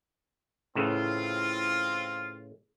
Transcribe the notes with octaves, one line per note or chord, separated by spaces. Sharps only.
A2 C#3 E3 C4 F4